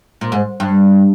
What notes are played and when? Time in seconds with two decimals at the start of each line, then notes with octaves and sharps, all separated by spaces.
0.21 A#2
0.32 G#2
0.60 G2